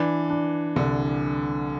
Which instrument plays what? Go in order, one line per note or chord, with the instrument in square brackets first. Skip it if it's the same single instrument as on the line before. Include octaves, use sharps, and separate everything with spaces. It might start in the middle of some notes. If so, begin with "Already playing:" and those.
Already playing: [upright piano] E3 [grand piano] D4
[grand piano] D4
[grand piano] C2 [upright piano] D3